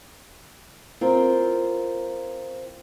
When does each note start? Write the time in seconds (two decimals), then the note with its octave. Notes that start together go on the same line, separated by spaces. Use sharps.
1.01 C4 F4 A#4